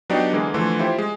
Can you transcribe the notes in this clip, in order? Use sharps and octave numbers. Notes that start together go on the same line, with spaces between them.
F#3 B3 D4 D#4 G4 D5
D3 E3 G#3 A#3
D3 E3 F3 A3 C6
E4 F4 G4 C5
G#3